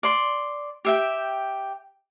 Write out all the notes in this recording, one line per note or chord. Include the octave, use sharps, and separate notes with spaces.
D5 C6
G4 E5 G5